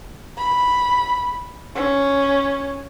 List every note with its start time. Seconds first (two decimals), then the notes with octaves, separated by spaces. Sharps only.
0.37 B5
1.75 C#4